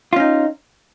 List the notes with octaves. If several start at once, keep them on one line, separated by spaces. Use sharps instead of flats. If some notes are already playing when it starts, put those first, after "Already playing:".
C#4 D#4 F4